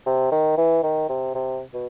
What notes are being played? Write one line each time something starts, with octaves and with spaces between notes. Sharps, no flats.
C3
D#3
E3
D#3
C3
C3
B2